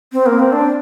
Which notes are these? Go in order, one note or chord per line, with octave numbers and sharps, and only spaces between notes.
C4
A#3
C4
D4